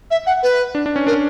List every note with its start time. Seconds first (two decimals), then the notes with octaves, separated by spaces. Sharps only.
0.11 E5
0.27 F#5
0.43 B4
0.75 D4
0.86 D4
0.96 C#4
1.07 D4 A#4